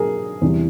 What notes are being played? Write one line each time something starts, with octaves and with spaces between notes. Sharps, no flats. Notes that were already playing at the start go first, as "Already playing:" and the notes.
Already playing: B2 F#3 G#4 A#4
E2 C3 E3 G3